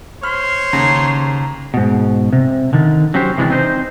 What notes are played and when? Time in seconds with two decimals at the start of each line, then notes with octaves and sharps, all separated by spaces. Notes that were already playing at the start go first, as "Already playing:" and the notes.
0.23 C5 C#5 C6 F6
0.73 D#2 C#3 A#5
1.74 G#2 B2
2.33 C3
2.73 D3 D#3
3.14 F#3 C#4 G4 C5
3.38 C3 E3 G#3 D4
3.50 C4 D#4 G#4 C5